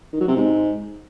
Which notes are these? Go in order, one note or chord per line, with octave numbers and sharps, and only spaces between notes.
D#3
F#3
C3
G#2